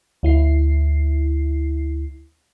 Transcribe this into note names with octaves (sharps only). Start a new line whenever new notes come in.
D2 E4 C7